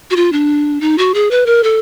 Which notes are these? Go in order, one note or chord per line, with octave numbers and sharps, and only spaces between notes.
F#4
F4
D4
D#4
F#4
G#4
B4
A#4
A4